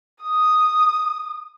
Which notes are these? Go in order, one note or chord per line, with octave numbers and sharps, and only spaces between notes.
D#6